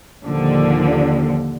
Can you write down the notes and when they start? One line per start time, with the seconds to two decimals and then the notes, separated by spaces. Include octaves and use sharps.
0.25 D#2 A#2 D3 F3